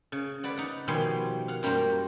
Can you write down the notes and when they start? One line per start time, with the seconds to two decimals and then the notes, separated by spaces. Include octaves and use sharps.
0.12 C#3
0.44 B4 D5 F#5
0.57 D#4 F#5
0.88 B2 D#3 F3 G3 G#5 C6
1.48 F5 F#5
1.63 F#2 G3 A#3 F4 A#4 C5